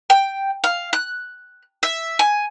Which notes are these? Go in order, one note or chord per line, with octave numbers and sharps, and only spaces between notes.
G5
F5
F#6
E5
G#5